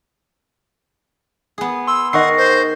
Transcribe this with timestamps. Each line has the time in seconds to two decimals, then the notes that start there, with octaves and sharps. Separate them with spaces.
1.58 B3 G#4
1.87 C6 E6
2.13 D#3 D#5 F#5 C#6 C7
2.37 C5